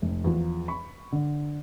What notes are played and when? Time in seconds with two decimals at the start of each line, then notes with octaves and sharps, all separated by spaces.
0.02 F1
0.24 E2 F3
0.68 B5 C#6
1.12 D3